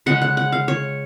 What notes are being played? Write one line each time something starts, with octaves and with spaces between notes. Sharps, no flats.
C#3 G#3 C#4 F#5
F#5
F#5
F5
C#5